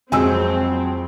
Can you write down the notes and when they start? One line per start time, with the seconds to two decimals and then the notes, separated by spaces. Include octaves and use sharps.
0.12 F2 F#3 G#3 C4 G#4 G#5 E6